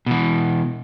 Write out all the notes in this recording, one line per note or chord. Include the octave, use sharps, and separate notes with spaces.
B2 E3